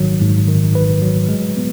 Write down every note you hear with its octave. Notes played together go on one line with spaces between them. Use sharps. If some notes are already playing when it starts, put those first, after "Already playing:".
Already playing: G#1 G#2 D#3 F#3
G#2
D#3
G#1 B4
F#3
G#3
B3